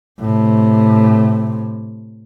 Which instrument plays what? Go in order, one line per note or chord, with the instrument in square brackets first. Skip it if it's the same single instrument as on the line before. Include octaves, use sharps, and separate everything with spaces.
[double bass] A2 C3